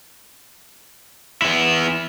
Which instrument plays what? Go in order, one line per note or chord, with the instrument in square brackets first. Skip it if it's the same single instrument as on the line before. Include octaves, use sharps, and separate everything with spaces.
[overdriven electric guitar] B3 E4